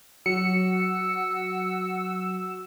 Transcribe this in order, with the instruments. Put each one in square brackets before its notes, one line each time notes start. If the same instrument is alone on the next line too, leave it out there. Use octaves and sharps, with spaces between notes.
[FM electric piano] F#3 [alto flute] F#4 [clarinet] E6 [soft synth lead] C#7